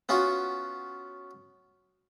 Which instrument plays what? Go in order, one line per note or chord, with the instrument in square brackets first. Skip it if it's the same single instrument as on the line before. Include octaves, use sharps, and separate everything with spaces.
[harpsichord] B3 C#4 F4 F#4